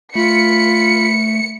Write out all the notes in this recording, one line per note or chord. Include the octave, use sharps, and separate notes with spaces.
A3 F4 B5 C#7